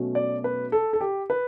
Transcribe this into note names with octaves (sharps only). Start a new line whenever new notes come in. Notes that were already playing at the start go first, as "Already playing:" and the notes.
Already playing: B2 F#3 A3 C#4
D5
B4
A4
A4
G4
B4